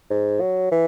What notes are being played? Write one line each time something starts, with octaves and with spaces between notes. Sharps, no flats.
G#2
F#3
E3